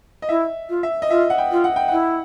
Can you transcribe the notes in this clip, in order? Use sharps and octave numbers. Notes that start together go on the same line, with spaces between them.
D#5
E4 E5
F4
E5
D#5
F4 E5
F#5
G5
F4
F#5
G5
E4 F#5